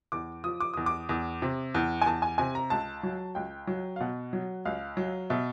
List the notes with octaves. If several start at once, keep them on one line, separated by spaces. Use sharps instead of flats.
E2 D6
F3 D#6
D6
E2 D#6
D6
E2
C3
E2
G#5
E2 A5
G#5
C3 G#5
A#5
C#2 A5
F#3
C#2 G5
F#3
F5
B2 F#5
F#3
C#2 F5
F#3
B2 E5